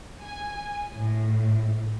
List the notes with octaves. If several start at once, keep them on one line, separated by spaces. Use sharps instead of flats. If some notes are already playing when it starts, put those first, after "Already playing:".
G#5
A2